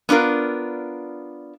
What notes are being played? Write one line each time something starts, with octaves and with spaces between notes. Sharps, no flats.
B3 D4 F4 A#4